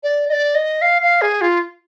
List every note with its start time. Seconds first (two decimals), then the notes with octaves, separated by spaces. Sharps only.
0.03 D5
0.29 D#5
0.33 D5
0.55 D#5
0.82 F5
1.02 F5
1.22 G#4
1.41 F4